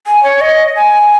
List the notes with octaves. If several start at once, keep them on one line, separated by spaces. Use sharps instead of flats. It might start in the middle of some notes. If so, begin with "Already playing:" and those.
G#5
C#5
D#5
G#5